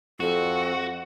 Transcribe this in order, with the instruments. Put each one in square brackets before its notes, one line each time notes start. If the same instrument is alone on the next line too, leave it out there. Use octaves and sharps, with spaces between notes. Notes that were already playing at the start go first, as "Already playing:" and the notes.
[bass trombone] F2 [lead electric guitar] F#4 [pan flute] A4